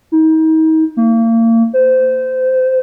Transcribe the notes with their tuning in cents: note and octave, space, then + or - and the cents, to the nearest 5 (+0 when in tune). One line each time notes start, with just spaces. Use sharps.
D#4 +35
A#3 -35
C5 -20